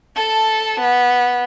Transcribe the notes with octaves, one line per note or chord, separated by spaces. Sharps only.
A4 A5
B3